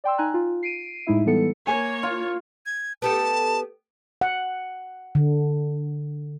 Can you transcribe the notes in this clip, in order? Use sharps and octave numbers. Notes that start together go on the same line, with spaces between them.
D5 G5 C6 E6
D#4 G#5 A#5 F#6
F4
C7 D7 D#7
A2 G#3 D#4 E4 E5
E3 G3 G#3 B3 A4 C#7
A#3 C#5 G#5
F4
G#6
B3 G4 A4 A5
F#5
D3